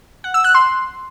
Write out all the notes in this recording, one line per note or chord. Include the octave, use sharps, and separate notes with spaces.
F#5
E6
F#6
C6